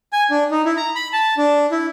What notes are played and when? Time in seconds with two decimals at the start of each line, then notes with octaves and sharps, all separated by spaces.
0.13 G#5
0.30 D4
0.51 D#4
0.65 E4
0.77 A#5
0.95 B5
1.13 A5
1.37 D4
1.72 E4